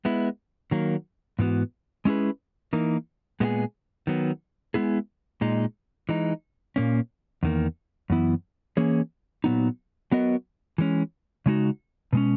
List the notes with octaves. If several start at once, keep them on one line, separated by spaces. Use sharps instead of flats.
G#3 B3 E4
D#3 F#3 A#3
G#2 E3 B3 F#4
G#3 C#4 E4 G#4 B4
E3 A#3 D#4 A#4
A#2 G#3 B3 E4 G#4
D#3 F#3 B3
G#3 B3 E4 G#4
A#2 G#3 D#4
E3 G#3 D#4
A#2 A#3 C#4
E2 D#3 A#3
F#2 E3 B3 E4
E3 A#3 C#4 G#4 C#5
A#2 F#3 B3 D#4
F#3 B3 F#4 A#4 D#5
E3 G#3 C#4
C#3 G#3 D#4 F#4
B2 G#3 C#4